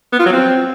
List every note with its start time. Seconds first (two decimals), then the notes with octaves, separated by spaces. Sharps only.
0.12 B3
0.19 F4
0.26 F#3
0.32 C4